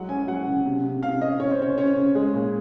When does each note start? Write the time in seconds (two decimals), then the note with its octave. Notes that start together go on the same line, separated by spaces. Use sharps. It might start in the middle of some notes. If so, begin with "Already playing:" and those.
Already playing: F#3 G#3 F#5
0.09 C#4 G#5
0.28 F#3 F#5
0.47 C#3
0.66 C3
0.83 C3
1.02 C3 F5
1.21 C#4 D#5
1.40 C#4 C#5
1.51 C5
1.59 C#3 C#5
1.78 C#4 C#5
1.96 C#3
2.15 G#3 G#4
2.34 A#2